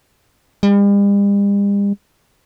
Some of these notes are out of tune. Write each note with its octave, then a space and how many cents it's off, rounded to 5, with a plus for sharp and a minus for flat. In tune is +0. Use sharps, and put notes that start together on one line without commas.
G3 +45